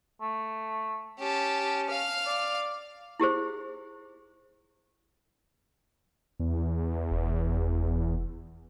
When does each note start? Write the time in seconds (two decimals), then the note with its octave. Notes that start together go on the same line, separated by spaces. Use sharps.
0.21 A3
1.19 C#4 G4 A5
1.90 F5 F6
2.26 D5
3.20 E4 G4 G#4 C5
6.40 E2
7.10 F1